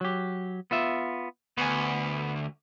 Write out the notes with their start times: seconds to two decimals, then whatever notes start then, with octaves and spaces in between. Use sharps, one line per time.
0.01 F#3 G4
0.71 B3 F4 E5
1.58 D2 B3 G#5